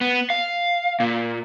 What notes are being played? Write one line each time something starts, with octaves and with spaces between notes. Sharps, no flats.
B3
F5
A#2